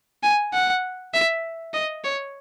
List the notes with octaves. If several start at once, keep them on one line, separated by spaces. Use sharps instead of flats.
G#5
F#5
E5
D#5
C#5